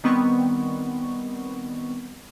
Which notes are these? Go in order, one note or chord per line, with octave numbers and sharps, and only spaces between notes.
D#3 G3 B3 C4 C#6